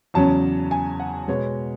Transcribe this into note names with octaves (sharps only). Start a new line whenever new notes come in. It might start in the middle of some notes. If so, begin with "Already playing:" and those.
E2 C#3 F#3 C#4 A5
G#5
F#5
B2 G#3 B3 C#5